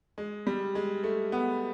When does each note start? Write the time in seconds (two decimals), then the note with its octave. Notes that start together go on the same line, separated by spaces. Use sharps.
0.18 G#3
0.47 G3
0.75 G#3
1.04 A3
1.32 B3